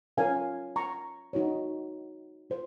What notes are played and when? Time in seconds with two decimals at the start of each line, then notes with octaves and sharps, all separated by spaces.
0.17 C#4 F4 A#4 C#5 F5 G#5
0.76 A#5 C#6
1.33 D#4 F#4 C#5
2.50 F4 C5